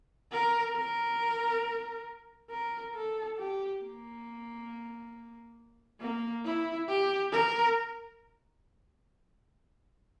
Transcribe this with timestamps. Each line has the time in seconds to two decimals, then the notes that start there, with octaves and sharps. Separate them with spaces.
0.32 A#4
0.76 A#4
2.51 A#4
2.95 A4
3.38 G4
3.82 A#3
6.01 A#3
6.45 E4
6.88 G4
7.32 A#4